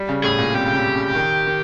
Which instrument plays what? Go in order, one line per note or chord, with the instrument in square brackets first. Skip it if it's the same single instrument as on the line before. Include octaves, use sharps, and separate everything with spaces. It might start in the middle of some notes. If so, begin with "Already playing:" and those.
Already playing: [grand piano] G3
C#3
[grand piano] A2 [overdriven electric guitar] G#4
[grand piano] A#2
[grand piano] C3 [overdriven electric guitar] G4
[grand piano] C#3
C3
C#3
D#3
D#3